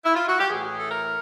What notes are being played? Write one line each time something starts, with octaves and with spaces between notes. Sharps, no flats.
E4
F4
F#4
G4
A2 E3 G#4
A4
A#4